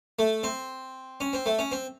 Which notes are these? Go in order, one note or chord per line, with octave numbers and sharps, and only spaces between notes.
A3
C4
C#4
C4
A3
C#4
C4